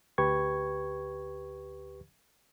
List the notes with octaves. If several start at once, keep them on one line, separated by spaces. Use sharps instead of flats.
D2 G4 B4 C#6 G#6